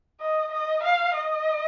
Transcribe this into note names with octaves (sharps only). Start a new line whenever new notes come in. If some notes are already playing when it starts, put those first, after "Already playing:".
D#5
D#5
F5
D#5